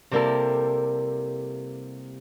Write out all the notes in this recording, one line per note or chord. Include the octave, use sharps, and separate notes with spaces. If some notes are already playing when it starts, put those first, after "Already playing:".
C3 G3 A#3 E4 A4